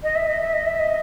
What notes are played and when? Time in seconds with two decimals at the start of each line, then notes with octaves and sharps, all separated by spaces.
0.03 D#5
0.15 E5
0.28 D#5
0.41 E5
0.53 D#5
0.65 E5
0.79 D#5